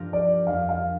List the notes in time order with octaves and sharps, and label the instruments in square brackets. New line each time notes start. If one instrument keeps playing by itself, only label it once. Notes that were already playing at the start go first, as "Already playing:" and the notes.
Already playing: [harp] G2 F3 D4 G4 A#4
[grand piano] D5
[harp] F2 F3 D4 [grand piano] F5
[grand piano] F5